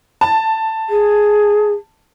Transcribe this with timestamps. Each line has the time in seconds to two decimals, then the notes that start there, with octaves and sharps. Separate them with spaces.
0.21 A5
0.90 G#4